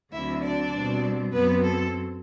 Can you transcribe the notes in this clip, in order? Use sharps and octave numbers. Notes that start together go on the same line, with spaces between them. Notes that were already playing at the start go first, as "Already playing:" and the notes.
D2 D3 F#3 C4 E4 E5
D4 D5
B2 G3 C4
F#2 F#3 B3 C4 B4
A4